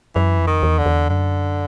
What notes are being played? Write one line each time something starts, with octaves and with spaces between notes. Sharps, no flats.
F#2 E3
F2
D#3
E2
D3
E2
F#2 D3